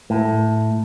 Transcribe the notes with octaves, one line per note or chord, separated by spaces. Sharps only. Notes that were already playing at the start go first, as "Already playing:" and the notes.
A2